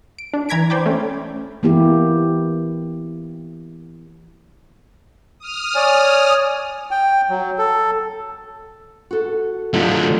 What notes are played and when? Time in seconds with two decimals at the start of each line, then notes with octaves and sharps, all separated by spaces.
0.19 D7
0.34 D4
0.49 E3 A#5 G#6 B6 D7
0.70 C5 D5 G5 B5 D6
0.86 A3 C#4
1.63 E3 A#3 B3 E4 G4
5.39 D#6 F6
5.76 C#5 D5 G#5
6.91 G5
7.29 F#3
7.58 A4
9.11 F#4 A4
9.74 D3 F3 F#3 A3